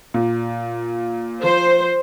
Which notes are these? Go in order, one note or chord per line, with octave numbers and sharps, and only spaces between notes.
A#2
F3 C5